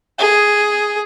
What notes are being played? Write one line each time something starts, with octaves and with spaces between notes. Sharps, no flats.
G#4